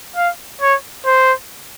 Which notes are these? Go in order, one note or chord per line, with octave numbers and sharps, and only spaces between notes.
F5
C#5
C5